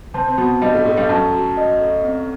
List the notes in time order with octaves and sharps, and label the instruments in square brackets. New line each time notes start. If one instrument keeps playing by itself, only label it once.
[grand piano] C3 C4 [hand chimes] A5
[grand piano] C4
[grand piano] B2 B3 [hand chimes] F#4
[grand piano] G2 G3 [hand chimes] D#5
[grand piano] A2 A3
[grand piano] A2 A3 [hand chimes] A4
[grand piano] G2 G3
[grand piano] F#2 F#3 [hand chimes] A5
[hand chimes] F#4
D#5
A4
C4